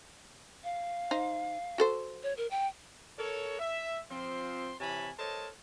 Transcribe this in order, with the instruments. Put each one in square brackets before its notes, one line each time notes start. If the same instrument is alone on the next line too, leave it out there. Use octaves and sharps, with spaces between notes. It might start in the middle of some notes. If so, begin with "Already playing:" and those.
[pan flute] F5
[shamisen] D#4 C5
F#4 A4 C5
[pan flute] C#5
A#4
G5
[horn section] A4 A#4 C#5
E5
F3 C4 C6
C3 E3 C#5 G#5 A5 B5
A4 A#4 C5 C#5 D#5 A5